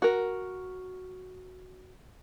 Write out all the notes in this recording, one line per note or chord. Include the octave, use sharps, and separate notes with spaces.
F#4 A#4